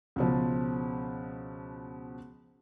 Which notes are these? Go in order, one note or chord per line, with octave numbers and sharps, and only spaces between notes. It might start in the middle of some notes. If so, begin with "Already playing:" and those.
C#2 B2 F3